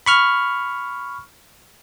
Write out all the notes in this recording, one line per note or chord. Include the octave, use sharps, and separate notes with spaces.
B5 C#6 F6